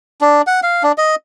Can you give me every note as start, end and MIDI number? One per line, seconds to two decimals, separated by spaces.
0.21 0.42 62
0.47 0.60 78
0.63 0.83 77
0.83 0.92 62
0.98 1.15 75